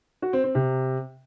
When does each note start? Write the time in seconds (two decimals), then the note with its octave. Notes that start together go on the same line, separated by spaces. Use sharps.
0.22 F#4
0.33 C4
0.44 C4
0.55 C3